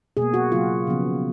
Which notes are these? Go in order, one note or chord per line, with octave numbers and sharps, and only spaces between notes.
B2 A#3 G#4
F#4
C#3 F#3 A#3 F4
C#3 F3 B3